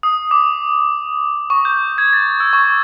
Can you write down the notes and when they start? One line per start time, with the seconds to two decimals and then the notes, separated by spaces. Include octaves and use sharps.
0.03 D#6
0.31 D6
1.50 C#6
1.65 G6
1.98 G#6
2.13 A6
2.40 E6
2.53 C#6